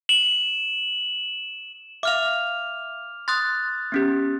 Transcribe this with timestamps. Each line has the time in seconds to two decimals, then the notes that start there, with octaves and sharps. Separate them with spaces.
0.09 E7 F#7
2.03 E5 F5 D6 F6 F7
3.28 C6 D#6 F#6 A6
3.92 B3 C#4 G4